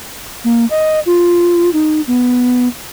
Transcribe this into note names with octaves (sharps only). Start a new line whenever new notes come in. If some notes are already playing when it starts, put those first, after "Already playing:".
A#3
D#5
F4
D#4
B3